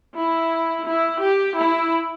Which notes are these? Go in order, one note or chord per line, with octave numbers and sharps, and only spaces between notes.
E4
E4
G4
E4